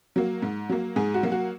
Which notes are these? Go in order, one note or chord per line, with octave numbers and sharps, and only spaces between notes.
F#3 A#3
G#2
F#3 A#3
G#2 G#4
F#4
F#3 A#3
F#4